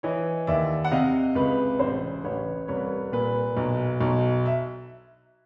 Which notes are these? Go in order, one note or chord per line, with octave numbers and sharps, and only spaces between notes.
E3 C#5 D#5
D#2 D5 E5
F#5
C3 D#5 F5
C#2 B4
A1 C5
A1 B4 C#5
C2 B4 C#5
A#2 B4
B1
B1
E5